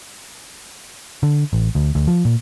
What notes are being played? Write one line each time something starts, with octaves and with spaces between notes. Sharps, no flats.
D3
A1
D2
D2
F3
A#2